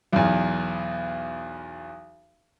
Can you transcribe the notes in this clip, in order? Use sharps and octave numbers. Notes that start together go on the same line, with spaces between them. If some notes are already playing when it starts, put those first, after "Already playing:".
B1 E2